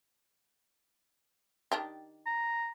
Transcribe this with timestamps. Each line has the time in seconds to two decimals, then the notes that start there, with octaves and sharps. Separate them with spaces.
1.72 D#3 D4 G4
2.26 A#5